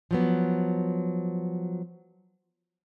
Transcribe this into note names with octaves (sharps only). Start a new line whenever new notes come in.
F3 F#3 B3